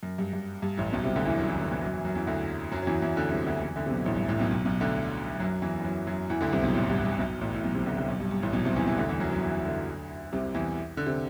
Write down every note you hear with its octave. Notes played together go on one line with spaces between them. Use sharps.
F#2
G2
G2
G2
A1 A2
B1 B2
C2 C3
D2 D3
E2 E3
F#2 F#3
E2 E3
D2 D3
E2 E3
F#2 F#3
E2 E3
F#2 F#3
E2 E3
D2 D3
F#2 F#3
F#3
E2 E3
E2 E3
D2 D3
C2 C3
D2 D3
E2 E3
D2 D3
C3
B1 B2
A1 A2
G2
A1 A2
B1 B2
B1 B2
B1 B2
D2 D3
F#2 F#3
E2 E3
E3
F#2 F#3
F#2 F#3
E2 E3
D2 D3
C2 C3
B1 B2
A1 A2
G2
G2
B1 B2
A1 A2
A2
B1 B2
C2 C3
D2 D3
C2 C3
B1 B2
G2
G2
A1 A2
B1 B2
C2 C3
E2 E3
E2 E3
D2 D3
E2 E3
F#2 F#3
F#2 F#3
E2 E3
D2 D3
C2 C3
E2 E3
D3
C3